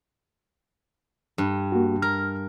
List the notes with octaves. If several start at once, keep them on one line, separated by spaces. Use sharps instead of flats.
G2
A#3 F#4
A#4 F6